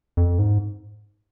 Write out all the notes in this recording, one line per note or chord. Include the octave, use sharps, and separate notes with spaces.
F2
G#2